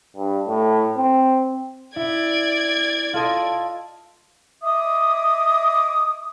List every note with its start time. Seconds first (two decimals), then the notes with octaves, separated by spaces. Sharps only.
0.16 G2
0.48 A2
0.97 C4
1.96 E4 D5 G#6
3.13 F4 A4 D#5
4.63 D#5 E5 D6 D#6